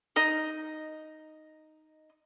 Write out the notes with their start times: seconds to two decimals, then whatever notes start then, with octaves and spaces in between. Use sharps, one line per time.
0.16 D#4 D#5 D#6